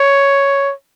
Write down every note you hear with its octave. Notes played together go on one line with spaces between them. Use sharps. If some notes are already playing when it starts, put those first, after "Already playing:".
Already playing: C#5